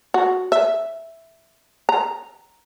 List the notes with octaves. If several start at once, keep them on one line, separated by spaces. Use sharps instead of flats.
F#4
E5
A#5